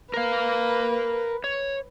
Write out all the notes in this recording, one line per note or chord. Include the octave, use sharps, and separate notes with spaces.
A#4 B4 F5
C#5